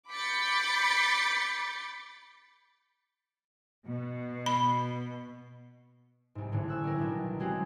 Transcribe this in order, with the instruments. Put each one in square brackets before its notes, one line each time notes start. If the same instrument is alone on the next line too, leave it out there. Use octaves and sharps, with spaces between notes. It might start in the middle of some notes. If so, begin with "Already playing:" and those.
[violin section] B5 D6 G6 A6 B6 C#7
[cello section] B2
[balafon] B5
[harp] C2 G#2
G#1 A2 D3 C#4
C#6 E6 F#6
G3 C#4 A#4
B1 D#3 D4 E4
F#3 G#3 C4 C#4 F#4 G4